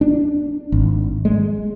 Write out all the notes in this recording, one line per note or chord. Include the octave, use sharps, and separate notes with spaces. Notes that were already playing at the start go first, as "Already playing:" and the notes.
D4
G#1
G#3